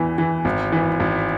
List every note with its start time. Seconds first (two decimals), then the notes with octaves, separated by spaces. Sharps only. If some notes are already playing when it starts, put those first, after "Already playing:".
Already playing: E2 E3
0.18 E3
0.45 G#1
0.72 E3
1.00 G#1